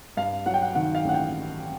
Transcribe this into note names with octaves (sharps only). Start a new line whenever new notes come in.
G2 F5
F#3 F#5
G5
F#5
D#3 F#5
F5
A1 F#5
G5